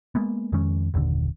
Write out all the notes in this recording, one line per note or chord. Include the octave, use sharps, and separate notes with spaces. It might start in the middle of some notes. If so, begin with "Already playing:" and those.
G#3 A#3 B3
F2 D#3 G#3 C#4
F#1 D#2 A#2 D3